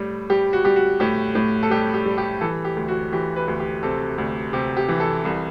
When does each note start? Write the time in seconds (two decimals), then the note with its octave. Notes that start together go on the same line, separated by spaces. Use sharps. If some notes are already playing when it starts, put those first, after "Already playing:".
Already playing: A2 G3
0.30 G3 G4
0.53 F#4
0.65 G3 G4
0.76 F#4
1.00 A2 G4
1.35 A2
1.63 A4
1.70 G3 G4
1.94 G4
2.06 G3
2.18 G4
2.41 E3 A4
2.64 G4
2.77 D2
2.88 F#4
3.13 E3 G4
3.36 B4
3.48 D2
3.60 G4
3.83 C3 A4
4.18 D2
4.53 C3 G4
4.77 G4
4.89 E3
5.00 A4
5.25 C2